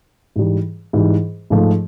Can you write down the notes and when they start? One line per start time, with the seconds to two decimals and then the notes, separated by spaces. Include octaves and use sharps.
0.36 G#2 E3 G3
0.93 G#2 E3 G3
1.50 G#2 F3 A3